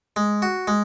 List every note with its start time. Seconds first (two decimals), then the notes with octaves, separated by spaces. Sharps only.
0.16 G#3
0.42 F#4
0.67 G#3